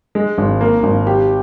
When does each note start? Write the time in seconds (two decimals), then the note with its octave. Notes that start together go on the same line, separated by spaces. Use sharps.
0.15 G#3
0.38 G#1
0.61 A#3
0.83 G#1
1.07 G4